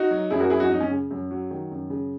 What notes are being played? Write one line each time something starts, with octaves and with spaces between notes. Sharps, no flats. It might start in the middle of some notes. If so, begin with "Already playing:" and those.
Already playing: D#4 F#4
F#3
F#2 E4 G#4
F#4 A#4
F#2 E4 G#4
D#4 F#4
F#2 D#4
C#4
C#3
F#2
F#3
D#3
F#2
C#3